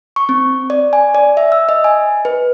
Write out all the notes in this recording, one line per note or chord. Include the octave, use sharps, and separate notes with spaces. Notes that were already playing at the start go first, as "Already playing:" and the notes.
C#6
C4
D5
G#5
D5
E5
E6
D#5
G#5
B4